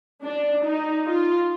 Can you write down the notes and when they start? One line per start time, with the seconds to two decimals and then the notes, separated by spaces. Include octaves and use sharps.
0.25 D4
0.65 D#4
1.07 F4